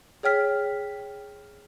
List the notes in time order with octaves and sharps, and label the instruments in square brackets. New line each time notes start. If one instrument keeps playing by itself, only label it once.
[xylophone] G#4 C#5 G5 F6 B6